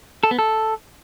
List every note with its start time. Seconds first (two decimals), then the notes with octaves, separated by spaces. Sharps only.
0.23 A4
0.31 B3
0.39 A4